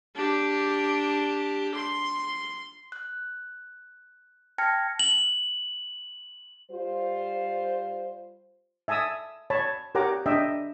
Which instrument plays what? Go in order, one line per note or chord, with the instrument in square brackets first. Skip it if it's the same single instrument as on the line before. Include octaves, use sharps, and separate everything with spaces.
[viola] D4 G4
C6
[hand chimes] F#6
G5 A5 F6 G#6 A#6 C#7
[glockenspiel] F#7
[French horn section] G3 F4 C5
[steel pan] E5 G#5 A5 D#6 E6
C#5 A5 B5
G4 A#4 C#5 F#5 A#5 D6
D4 D#5 E5 G5